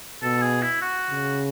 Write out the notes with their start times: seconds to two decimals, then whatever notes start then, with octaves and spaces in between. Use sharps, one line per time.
0.22 B2 A4
0.42 G#4
0.62 E4
0.82 F#4
1.10 C#3